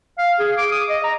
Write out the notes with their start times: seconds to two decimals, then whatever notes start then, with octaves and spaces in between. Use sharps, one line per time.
0.18 F5
0.39 G#4
0.58 D6
0.72 D#6
0.89 D#5
1.04 A#5